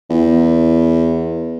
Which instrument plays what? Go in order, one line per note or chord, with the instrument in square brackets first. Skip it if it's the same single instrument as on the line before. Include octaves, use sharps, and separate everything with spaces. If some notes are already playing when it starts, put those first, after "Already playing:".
[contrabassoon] E2